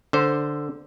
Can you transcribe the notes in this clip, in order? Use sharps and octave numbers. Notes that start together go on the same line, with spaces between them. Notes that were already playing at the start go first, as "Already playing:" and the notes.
D3 C5